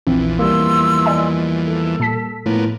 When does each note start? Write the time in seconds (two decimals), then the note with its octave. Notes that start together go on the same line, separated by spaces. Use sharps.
0.07 A#1 E2 E3 F3 C4
0.39 G3 A#3 C6 E6
1.06 D5 D#5 G#5
1.65 A4
2.00 A#2 A5 B6
2.46 A2 F3 A#3 B3